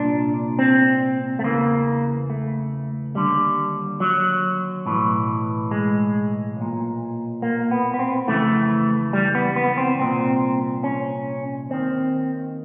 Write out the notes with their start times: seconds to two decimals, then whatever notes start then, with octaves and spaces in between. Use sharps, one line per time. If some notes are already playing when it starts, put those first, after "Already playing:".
Already playing: C2 A#2 D4
0.59 C4
1.39 A3
1.44 E2 C#3 E3 A#3
2.30 A3
3.15 D#2 D3 G3
4.00 F#3
4.86 B1 A2 E3
5.71 G#3
6.57 B1 A#2
7.42 A#3
7.71 B3
7.94 B3
7.99 C4
8.28 F2 C#3 E3 A3
9.13 G3
9.35 B3
9.56 B3
9.78 C4
9.99 C2 A#2 C4
10.84 C#4
11.70 D#2 D#3 C4